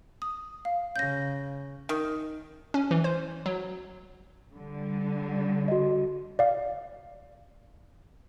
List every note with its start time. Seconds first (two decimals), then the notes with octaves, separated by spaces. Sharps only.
0.22 D#6
0.65 F5
0.96 C#3 G6 A#6
1.89 D#3
2.74 C#4
2.91 E3
3.04 C5
3.46 F#3
4.56 D3 G3
5.68 F#4 D#5
6.39 D5 F5